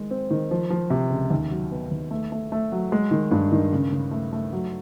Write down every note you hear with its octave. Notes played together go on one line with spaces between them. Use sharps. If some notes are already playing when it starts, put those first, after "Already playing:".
Already playing: D#3 G#3
C4
D#3
F3
F3
C3
C#2
D#2
F#3
B3
D#2
A3
A3
A3
F#3
G#3
D#3
G2
D#3
C#3
C#3
A3
A3
F#3